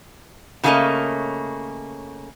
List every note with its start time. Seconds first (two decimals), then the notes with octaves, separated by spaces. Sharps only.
0.63 C#3 F3 A3 A#3 C#4 D#5